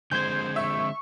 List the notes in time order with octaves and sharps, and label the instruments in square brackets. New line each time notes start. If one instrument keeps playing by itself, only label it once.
[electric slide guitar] D3 G#3 C4 [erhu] C5 [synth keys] G6 G#6
[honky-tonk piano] E5 [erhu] C#6